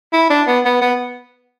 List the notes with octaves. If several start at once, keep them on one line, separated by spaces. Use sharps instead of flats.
E4
D4
B3
B3
B3